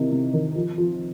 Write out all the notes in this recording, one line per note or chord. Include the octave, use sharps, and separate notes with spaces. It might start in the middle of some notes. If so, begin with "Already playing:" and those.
Already playing: C3 D#3 E3
C3
D#3
F3
F3